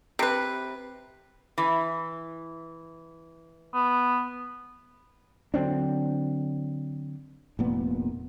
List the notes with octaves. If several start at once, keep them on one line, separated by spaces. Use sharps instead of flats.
C3 B4
E3
B3
D3 F#3 C4 D4
F1 A#2 B3